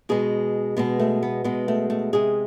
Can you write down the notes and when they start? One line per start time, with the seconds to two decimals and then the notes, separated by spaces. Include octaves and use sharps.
0.09 B2 G#3 G#4
0.77 B2 G#3 B3
1.00 A3
1.23 B3
1.44 B2 G#3 B3
1.68 A3
1.90 A3
2.13 C3 G#3 G#4